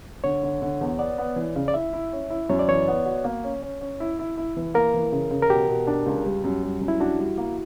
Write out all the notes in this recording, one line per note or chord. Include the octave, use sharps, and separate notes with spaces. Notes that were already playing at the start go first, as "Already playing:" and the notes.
D3 C#5
D3
D3
E2
B3 D5
B3
E3
C#3
D5
E4 E5
E4
C#4
E4
F#2 C#5
D5
E3 C#5
B3
F#4
A#3
C#4
C#4
C#4
E4
E4
E4
E3
A#3 A#4
E3
C#3
C#3
A#4
B2 G4
B2
D4
C#2
G3
F#2
G3
F#2
E4
D4 F#4
G3
A#3